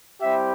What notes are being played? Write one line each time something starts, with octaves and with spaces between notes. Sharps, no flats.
G3 C4 E4 G4 E5